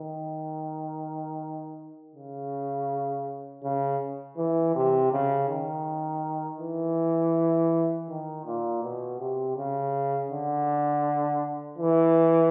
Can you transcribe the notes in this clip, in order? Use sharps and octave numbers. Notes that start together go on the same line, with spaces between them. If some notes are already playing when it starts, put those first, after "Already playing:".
Already playing: D#3
C#3
C#3
E3
C3
C#3
D#3
E3
D#3
A#2
B2
C3
C#3
D3
E3